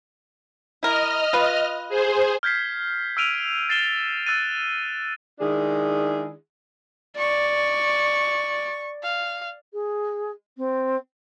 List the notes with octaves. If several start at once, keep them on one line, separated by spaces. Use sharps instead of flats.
E4 A#4 D#5 F6
F4 B4
G#4 C5
F6 G6 G#6 B6 C7
E6 F6 D7 D#7 F7
A6 C7 E7 G7
E6 F#6 A6 D#7
D#3 G#3 D4 E4 G#4
D5 C#6
F5
G#4
C4